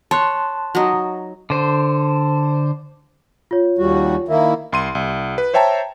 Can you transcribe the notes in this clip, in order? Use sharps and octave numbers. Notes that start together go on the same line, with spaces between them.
C#5 A5 C6 F#6
F#3 D#4
D3 C5
F4 C#5
D#2 G3 F#4
D#3 A#3 E4
C2 C6 D#7
C2
B4
C5 C#5 E5 G5 A5 A#5